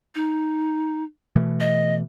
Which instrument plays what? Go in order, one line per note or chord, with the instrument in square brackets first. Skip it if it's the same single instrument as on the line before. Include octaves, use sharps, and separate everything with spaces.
[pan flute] D#4
[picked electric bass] B2 E3 A3
[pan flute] D#5